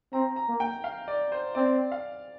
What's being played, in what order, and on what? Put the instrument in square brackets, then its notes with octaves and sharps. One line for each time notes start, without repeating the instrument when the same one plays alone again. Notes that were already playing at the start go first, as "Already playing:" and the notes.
[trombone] C4 [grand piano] A#5
[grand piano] A#5
[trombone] A#3
[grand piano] G5
F5
D5
C5
[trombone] C4 [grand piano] D5
[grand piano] F5